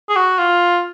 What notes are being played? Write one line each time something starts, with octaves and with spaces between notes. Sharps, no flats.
G#4
F#4
F4